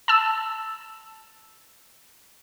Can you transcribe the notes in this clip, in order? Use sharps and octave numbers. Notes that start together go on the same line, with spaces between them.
A5 E6